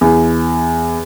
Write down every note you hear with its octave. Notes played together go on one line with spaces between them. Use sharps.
E2